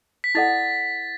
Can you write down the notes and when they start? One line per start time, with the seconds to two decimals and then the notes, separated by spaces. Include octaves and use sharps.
0.24 B6
0.35 E4 A4 D5 F#5 A6